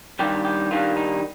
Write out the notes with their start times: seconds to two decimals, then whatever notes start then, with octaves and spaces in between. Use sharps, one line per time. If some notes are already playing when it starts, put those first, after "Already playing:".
0.19 G2 D#3 G3 G4
0.45 G4
0.71 G2 D#3 G3 F4
0.97 D#4